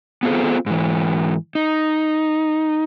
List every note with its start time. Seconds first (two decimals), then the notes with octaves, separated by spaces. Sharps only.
0.23 B3 C4 F4 G#4 A4 C5
0.66 G#2 E3
1.55 D#4